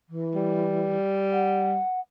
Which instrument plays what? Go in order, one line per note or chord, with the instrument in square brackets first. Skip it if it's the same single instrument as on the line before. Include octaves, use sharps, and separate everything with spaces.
[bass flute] E3
[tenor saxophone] G3
[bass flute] F#5